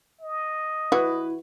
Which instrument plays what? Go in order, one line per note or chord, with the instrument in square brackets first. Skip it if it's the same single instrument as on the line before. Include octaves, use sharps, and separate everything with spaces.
[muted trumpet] D#5
[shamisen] E3 F#4 [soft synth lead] E4 [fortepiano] B4